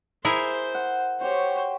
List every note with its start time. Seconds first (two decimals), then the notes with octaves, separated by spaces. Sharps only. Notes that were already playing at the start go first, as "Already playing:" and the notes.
0.25 E4 G#4 A#4 C5
0.75 F#5
1.21 F#4 G4 C5 C#5